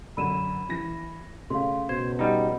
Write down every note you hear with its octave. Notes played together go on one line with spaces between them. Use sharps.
F#2 D3 B5 D#7 E7
E3 A#6
C#3 A3 F5 C6
B2 C5 G#6
G3 D#4 D#5 F#5 B5